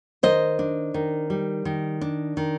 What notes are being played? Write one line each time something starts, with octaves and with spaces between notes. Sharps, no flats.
D#3 C5 D#5
D4
D#3
G3
D#3
D4
D#3